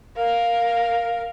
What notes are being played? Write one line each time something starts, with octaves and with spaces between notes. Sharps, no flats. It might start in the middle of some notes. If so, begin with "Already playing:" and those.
A#4 F5